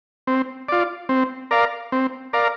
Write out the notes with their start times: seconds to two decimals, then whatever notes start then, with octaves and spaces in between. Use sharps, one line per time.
0.27 C4
0.68 F4 D5
1.09 C4
1.51 A#4 D5 F5
1.92 C4
2.33 A#4 D5 F5